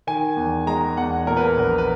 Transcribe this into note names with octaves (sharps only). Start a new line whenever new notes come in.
D#3 G#5
E2
G#3 A#5
E2 F#5
A#2 A#4
B4
A#4
A#1
B4